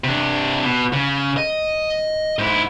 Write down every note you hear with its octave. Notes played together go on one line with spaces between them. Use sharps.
C3 D4
B2
C#3
D#5
G#2 E4